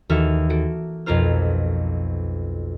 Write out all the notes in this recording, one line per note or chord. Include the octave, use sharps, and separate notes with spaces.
D#2 E3 F#4 A4 E5 F6
F#4 A4 D7
B1 F2 F4 A#4 C5 F6